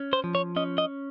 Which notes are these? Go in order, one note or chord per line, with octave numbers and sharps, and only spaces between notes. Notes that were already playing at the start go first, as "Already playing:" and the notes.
Already playing: C#4
C5
F3
C#5
C#4 D#5
D#5